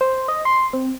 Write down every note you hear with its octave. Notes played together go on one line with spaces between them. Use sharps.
C5
D#5
C6
C4